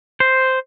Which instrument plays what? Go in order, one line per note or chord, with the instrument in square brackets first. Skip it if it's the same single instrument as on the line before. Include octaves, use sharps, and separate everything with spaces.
[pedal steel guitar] C5